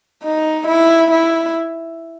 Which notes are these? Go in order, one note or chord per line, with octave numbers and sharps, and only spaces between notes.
D#4
E4
E4